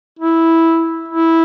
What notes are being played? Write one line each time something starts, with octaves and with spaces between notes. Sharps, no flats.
E4
E4